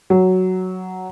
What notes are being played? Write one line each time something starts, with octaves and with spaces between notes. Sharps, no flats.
F#3